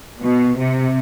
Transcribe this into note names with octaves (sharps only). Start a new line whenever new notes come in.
B2
C3